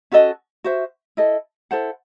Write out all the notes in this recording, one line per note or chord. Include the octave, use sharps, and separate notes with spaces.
C#4 F#4 A4 D#5
F#4 C5 E5
E4 A4 D#5
E4 A4 C5 F#5